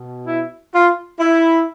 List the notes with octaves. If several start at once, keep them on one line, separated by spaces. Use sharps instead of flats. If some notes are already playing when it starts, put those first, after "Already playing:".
Already playing: B2
E4
F4
E4